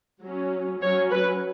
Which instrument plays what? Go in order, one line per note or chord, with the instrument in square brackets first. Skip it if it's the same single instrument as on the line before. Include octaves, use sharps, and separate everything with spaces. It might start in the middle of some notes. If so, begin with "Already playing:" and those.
[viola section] F#3 C#4
F#3 C#4 C#5
B4